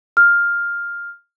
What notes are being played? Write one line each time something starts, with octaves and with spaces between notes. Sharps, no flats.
F6